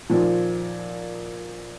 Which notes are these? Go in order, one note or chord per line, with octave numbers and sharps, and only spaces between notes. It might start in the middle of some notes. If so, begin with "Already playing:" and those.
A#2 D#3 F3